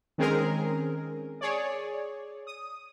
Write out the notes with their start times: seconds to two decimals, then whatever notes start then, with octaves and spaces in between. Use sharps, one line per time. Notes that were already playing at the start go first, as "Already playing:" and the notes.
0.18 D#3 G#3 C4 C#4 G#4 A#4
1.41 G#4 C#5 D5
2.47 D#6